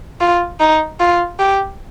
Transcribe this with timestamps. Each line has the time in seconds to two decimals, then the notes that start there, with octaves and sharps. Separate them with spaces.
0.21 F4
0.60 D#4
1.00 F4
1.40 G4